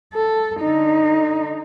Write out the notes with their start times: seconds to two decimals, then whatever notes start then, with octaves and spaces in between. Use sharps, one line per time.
0.14 A4
0.61 D3 D#4